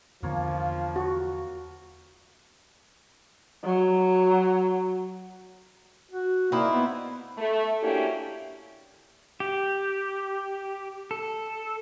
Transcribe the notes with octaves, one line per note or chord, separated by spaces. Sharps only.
E2 D3 F3 A#3 F4 C#5
F#4
F#3
F#4
A#3 C4 D#4 E4
B3
A3
A#3 C#4 D4 E4 F#4 G4
G4
A4